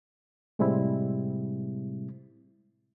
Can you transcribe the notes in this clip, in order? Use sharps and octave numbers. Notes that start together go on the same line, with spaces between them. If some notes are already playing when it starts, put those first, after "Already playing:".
A2 C3 G3 G#3 C4 E4